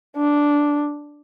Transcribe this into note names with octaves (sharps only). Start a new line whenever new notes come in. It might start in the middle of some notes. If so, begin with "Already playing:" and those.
D4